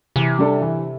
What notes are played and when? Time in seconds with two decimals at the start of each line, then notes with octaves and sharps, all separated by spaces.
0.16 C3 E3
0.39 G3 D4 A4
0.61 E3